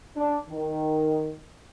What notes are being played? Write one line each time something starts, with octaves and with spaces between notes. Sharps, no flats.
D4
D#3